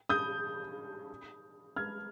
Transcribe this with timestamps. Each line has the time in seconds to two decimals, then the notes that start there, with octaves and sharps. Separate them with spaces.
0.09 D#6 G6
1.76 F6 G#6